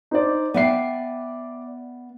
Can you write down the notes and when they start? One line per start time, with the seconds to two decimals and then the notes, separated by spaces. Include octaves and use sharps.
0.11 D#4 C5 D5
0.54 B3 D5 E5 G5 C7